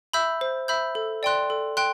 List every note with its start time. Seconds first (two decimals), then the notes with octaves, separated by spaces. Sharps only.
0.13 E5 B5 E6 G6
0.41 C5
0.68 E5 B5 E6 G6
0.95 A4
1.23 D5 G5 C6 F#6
1.50 A4
1.77 G5 C6 F#6